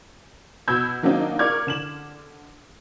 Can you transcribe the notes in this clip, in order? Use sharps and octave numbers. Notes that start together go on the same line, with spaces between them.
B2 E6 G6 G#6
D#3 F#3 A#3 C4 D4 D#4
A#4 D5 C#6 D6 F6 G#6
D3 E7 F#7